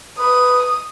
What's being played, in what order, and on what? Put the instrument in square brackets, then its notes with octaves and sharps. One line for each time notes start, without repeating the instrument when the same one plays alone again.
[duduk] B4 [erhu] D#6